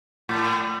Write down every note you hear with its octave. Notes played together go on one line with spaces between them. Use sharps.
A2